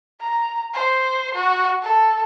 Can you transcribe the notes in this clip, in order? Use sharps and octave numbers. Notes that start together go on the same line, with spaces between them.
A#5
C5
F#4
A4